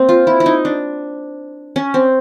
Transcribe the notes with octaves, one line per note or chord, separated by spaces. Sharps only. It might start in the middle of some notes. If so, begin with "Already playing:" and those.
Already playing: A#3 C4
F4
E4
E4
D#4
D4
C#4
C4